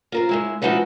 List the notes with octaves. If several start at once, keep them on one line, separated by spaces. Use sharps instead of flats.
F4 A#4 C5
C#3 G#3 E4
F3 G#3 D#4 E4 F#4 B4